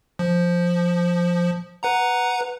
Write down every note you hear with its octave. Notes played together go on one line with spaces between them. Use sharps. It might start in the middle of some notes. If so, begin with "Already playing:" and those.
F3
B4 F#5 A#5